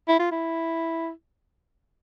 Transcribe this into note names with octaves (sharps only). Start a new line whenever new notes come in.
E4
F4
E4